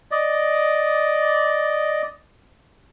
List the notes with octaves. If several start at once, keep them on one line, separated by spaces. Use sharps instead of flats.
D5 D#5